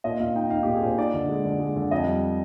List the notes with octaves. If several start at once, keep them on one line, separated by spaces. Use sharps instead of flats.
A#2 D#5
A#2 F5
D#4 G5
D#4 F5
A#2 G4
G#4
A#2 C5
D#4 D5
D3
G#3
D3
G#3
D3
F2 D#5
G3